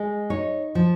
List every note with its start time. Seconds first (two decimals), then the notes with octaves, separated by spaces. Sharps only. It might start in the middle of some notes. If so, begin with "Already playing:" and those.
Already playing: G#3
0.30 D#4 C#5
0.75 F3